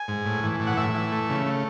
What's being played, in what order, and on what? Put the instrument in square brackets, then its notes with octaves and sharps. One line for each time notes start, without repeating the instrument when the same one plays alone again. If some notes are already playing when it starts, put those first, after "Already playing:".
Already playing: [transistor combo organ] G#5
G#2
A2
E3
A2
F#5
A2 E5
E3
A3
C#3
A3